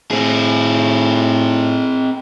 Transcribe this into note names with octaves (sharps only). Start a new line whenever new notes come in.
A2 C4 G#4